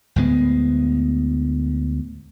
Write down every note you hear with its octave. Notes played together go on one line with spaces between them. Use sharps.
D2 A2 G#3 B3